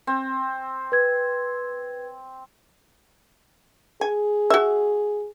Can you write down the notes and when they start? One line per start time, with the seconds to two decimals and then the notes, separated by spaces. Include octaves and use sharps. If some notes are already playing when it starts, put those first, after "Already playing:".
0.07 C4
0.92 B4 G#6
4.01 G#4 G#5
4.50 F#4 E5